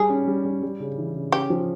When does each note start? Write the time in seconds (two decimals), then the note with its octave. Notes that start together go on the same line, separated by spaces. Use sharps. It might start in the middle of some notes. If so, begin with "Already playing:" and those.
Already playing: G3 G#4
0.10 C#4
0.28 G3
0.45 G3
0.63 G3
0.80 C#3
0.98 E3
1.15 C#3
1.32 C#4 G4
1.50 F3